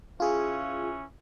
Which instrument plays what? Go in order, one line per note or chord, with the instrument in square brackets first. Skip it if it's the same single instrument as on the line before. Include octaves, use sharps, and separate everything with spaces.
[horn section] E3 C#4 [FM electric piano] F4 G#4